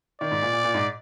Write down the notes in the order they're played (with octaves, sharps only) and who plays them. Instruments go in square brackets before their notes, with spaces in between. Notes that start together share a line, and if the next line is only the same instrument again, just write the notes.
[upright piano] D#3 [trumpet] D5
[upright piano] G#2
A#2
A#2
A#2
G#2